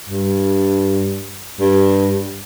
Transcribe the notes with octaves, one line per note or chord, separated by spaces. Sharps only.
G2
G2